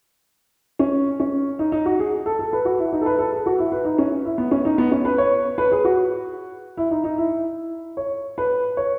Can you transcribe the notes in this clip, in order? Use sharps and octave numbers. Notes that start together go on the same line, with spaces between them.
C#4
C#4
D#4
D#4
F#4
G#4
A4
A4
B4
F#4
E4
D#4
A4
B4
A4
G#4
F#4
E4
B4
D#4
C#4
E4
B3
C#4
D#4
B3
C#4
B4
C#5
B4
G#4
F#4
E4
D#4
D#4
E4
C#5
B4
C#5